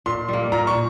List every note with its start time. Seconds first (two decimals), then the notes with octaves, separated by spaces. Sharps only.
0.06 A#2 C6
0.28 G3 A#3
0.52 A#2 A#5
0.67 C#6